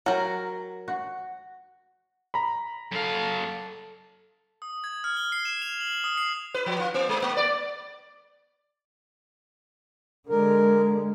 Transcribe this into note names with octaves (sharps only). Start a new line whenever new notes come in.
F#3 A#4 F#5 G5
F#4
A#5 B5
F#2 A4 F5
D#6
G#6
F6
G7
C7
E7
F7
F#7
D#6
C7
B4
F3
F4
B3
G#3
A#3
D5
D3 G#3 A#4